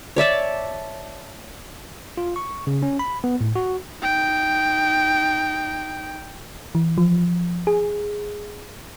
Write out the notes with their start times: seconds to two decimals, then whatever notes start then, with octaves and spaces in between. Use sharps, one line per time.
0.16 C#5 D5 E5 A5
2.17 F4
2.36 C#6
2.67 C#3
2.83 C#4
2.99 B5
3.24 B3
3.41 A2
3.56 F#4
4.02 D#4 G5
6.75 E3
6.98 F3
7.67 G#4